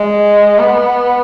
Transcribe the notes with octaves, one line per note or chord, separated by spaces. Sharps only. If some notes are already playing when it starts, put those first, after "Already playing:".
Already playing: G#3
B3